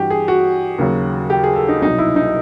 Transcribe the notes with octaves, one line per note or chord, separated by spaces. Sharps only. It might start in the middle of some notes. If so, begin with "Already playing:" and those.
Already playing: G2 E3 F#4 G4
G#4
F#4
D#2 C#3 F#3
G4
G#4
A4
D#4
C2 B2 F#3 D#4
E4
D#4